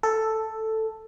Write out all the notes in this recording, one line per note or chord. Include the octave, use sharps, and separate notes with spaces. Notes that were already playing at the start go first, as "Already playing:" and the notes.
A4